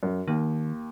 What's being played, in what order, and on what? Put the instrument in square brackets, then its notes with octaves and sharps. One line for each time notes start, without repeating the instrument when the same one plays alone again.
[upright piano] F#2
[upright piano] D#2 [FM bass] D#3